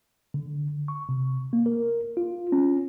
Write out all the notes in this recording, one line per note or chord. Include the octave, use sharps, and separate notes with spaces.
D3
C#6
C3
A#3
A#4
F4
C#4